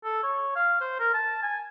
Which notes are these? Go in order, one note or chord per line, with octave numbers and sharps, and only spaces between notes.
A4
C#5
F5
C5
A#4
A5
G#5